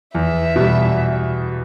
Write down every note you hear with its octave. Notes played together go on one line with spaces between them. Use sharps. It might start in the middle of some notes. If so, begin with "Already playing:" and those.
E2 E5
B2 G3